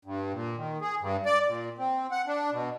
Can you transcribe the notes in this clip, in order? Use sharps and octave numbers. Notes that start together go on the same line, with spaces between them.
G2
A#2
D#3
G#4
G2
D5
A#2
C4
F#5
D4
B2